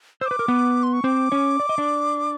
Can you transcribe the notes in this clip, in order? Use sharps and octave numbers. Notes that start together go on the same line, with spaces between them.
C5 E6
D6
B4
A#4
B3 B4
C6
C#6
C4 C5 D6
C#4 C#5
D5
D#5
D4 D5